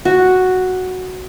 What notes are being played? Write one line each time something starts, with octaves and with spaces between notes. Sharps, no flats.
F#4